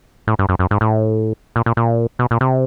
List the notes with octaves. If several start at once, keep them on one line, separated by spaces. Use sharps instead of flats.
A2
G2
F#2
F#2
G#2
A2
A#2
A#2
A#2
B2
A#2
C3